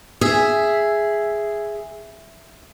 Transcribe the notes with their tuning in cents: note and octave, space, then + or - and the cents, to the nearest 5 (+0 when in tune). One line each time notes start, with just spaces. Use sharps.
G#4 +0 E5 +5